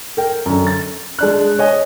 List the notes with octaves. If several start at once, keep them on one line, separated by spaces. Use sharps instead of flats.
A#4 G5
F#2 D3
A6
G#3 D4 F#6
C#5 D#5 G#5